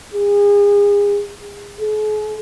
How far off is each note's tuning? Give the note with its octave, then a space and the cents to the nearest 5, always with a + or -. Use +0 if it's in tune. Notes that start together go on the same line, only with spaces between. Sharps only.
G#4 -35
G#4 +45